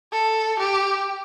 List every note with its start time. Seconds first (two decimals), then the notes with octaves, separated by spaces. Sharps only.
0.13 A4
0.59 G4